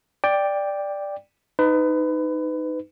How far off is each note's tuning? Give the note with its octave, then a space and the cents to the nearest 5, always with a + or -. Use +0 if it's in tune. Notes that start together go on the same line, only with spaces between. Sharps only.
D5 +0 G5 +10
D#4 +0 B4 +25